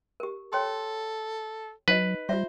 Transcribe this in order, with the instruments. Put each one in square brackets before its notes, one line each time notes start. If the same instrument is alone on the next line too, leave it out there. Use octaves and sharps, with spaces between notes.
[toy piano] G4 A#4
[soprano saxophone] A4 [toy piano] C#5 G5 C6
[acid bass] F#3 [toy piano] D#4 D#5 [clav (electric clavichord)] B4
[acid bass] G3 [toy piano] F4 E5 [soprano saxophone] C5